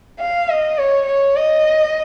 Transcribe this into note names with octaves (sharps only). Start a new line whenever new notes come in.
F5
D#5
C#5
C#5
D#5